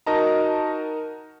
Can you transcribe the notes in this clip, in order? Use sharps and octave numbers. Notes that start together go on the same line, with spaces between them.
D#4 F#4 A#4 D#5 A5 A#5